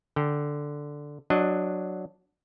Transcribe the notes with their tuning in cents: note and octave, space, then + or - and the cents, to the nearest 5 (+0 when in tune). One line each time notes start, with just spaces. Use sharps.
D3 +0 G5 +0
F#3 -5 D4 +5 D#5 -20